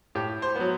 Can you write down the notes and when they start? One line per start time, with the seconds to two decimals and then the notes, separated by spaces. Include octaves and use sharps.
0.15 A2 G4
0.42 C5
0.56 F#3 B3